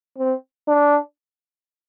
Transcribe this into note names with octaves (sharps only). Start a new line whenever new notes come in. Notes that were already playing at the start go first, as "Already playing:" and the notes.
C4
D4